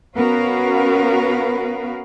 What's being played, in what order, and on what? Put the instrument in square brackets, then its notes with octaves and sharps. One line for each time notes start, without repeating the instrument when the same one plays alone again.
[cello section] B3 C#4 F#4 A#4 B4 F5